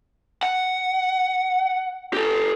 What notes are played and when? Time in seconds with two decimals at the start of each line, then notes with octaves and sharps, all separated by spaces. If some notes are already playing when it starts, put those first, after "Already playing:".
0.43 F#5
2.13 G4 A4